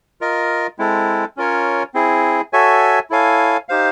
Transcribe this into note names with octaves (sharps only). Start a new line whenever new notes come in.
F4 A#4 D#5
G#3 C4 E4 A4
C#4 F4 A#4 C#5
C4 E4 G#4
F#4 A4 C#5 E5 G#5
E4 A4 C#5 F5 G#5
D#4 G4 C5 F5